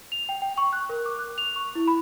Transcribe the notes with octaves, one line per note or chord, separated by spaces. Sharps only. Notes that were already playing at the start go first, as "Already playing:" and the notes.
F7
G5
G5
C#6
F#6
A#4
D6
F#6
F7
C#6
E4
B5